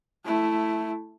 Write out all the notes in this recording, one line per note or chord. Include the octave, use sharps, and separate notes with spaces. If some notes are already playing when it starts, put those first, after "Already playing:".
A3 E4